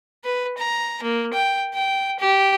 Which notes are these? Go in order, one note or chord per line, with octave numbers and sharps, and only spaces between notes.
B4
A#5
A#3
G5
G5
G4